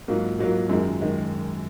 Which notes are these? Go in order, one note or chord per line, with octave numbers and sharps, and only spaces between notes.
G#2 F#3 A#3 F4
G#2 F#3 A#3 F4
F#2 D#3 G#3
D#3 G#3